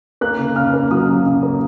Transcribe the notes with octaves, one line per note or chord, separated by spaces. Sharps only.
A#3 F#6
C#3
C#3 F6
A#3
F#3 D#6
C#3
C#3
A#3